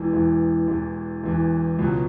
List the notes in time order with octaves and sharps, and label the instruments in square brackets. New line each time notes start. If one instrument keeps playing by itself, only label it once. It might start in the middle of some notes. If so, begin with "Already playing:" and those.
Already playing: [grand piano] E1 E2 E3
E1 E2 E3
E1 E2 E3
E1 E2 E3
C#2 B2 F#3